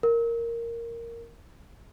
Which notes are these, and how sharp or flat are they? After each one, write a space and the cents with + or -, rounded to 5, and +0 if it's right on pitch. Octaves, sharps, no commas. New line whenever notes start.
A#4 -5